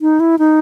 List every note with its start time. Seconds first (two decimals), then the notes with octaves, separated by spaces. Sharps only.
0.01 D#4
0.20 E4
0.39 D#4